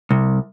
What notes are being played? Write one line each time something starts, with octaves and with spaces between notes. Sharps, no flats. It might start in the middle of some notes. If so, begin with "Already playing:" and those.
C2